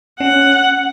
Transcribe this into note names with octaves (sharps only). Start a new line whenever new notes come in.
C#4 F#5